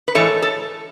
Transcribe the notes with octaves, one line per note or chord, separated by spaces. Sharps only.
B4
A2 E3 G#3 A4 C#5
A4